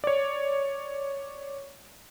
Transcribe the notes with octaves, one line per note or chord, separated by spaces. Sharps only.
C#5 D5